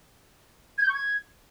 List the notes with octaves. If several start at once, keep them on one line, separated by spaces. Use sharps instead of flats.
G#6
G6
C#6
G#6